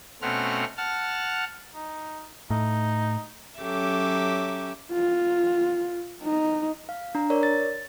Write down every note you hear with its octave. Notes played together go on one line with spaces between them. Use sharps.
B2 A3 C4 C#4 F#5 F6
F#5 A5 F6
D#4
A2 D#4
F#3 C#4 G4 A4 E5 D6
F4
D#4
F5
D4 A#5
A#4 C#5 D5
A6